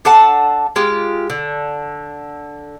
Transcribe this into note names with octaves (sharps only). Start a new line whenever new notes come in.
D4 A4 F#5 A5
G#3 F4 G4
D3